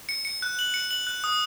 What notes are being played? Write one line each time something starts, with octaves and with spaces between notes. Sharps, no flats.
C#7
C#7
F#6
F#7
C#7
F#7
F#6
D#6